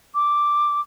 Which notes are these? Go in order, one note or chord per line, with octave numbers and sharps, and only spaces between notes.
D6